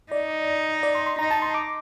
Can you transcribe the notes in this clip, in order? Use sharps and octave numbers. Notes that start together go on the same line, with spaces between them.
D#4 D5
D5
C6
C6
D#4 A#5
A5
C6
D6